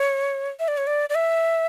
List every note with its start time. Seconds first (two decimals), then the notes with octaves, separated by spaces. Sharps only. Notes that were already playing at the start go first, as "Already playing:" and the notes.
Already playing: C#5
0.59 E5
0.68 D5
0.77 C#5
0.87 D5
1.10 D5
1.15 E5